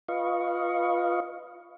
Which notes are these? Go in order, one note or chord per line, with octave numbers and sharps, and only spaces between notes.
F4 B4 D#5 F5 C#6